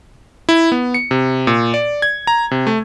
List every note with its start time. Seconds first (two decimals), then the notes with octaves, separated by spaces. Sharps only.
0.49 E4
0.72 B3
0.94 C#7
1.11 C3
1.47 A#2
1.74 D5
2.02 G#6
2.27 A#5
2.51 C3
2.67 A3